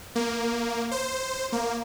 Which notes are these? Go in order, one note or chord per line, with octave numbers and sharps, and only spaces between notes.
A#3
C5
A#3